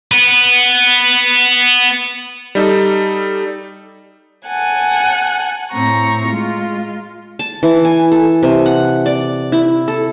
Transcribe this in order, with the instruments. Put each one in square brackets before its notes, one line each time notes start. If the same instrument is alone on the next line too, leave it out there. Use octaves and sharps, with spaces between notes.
[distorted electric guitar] B3 B4
[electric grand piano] G3 D#4 A4
[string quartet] F#5 G#5 A5
A2 C4 A#5 C#6
G#3 F4
[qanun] A5
E3
G#5
A4
C3
F#5
D5
E4
A4